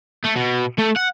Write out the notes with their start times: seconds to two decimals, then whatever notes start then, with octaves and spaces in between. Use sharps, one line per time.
0.25 A3
0.36 B2
0.79 A3
0.97 F#5